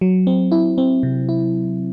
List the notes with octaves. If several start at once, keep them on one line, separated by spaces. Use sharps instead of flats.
F#3
C4
E4
C4
C3
E4